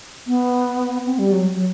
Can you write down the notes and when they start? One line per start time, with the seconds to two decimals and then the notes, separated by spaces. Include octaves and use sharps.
0.27 B3
1.06 C4
1.19 G3
1.32 F#3
1.55 F#3